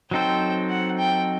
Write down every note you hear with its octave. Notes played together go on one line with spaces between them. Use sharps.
F#3 C4 D#4 A4 C5 G5
F#5
G5